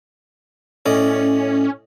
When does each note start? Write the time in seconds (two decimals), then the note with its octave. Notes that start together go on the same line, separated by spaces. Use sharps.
0.86 A2 C#4 D5 D#5